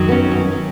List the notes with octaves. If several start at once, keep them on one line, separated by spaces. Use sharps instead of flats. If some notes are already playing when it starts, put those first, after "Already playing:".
Already playing: F#2 D#3 F#3
B3
C#4
C#4
D#3 F#3